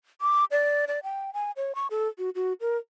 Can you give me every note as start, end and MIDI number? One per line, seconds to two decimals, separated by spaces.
0.21 0.45 86
0.51 0.85 74
0.88 1.00 74
1.03 1.33 79
1.33 1.52 80
1.57 1.75 73
1.75 1.87 85
1.91 2.08 69
2.18 2.30 66
2.35 2.53 66
2.61 2.77 70